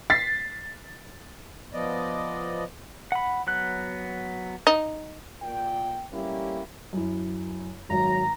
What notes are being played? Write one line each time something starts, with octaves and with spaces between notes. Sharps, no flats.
A6 B6 C7
F3 B3 D5 D#5
F#5 B5
F#3 B3 F#6
D#4
A#2 G5
G3 A3 A#3 C#4 E4 G4
F#2 E4
G#1 F#3 A#5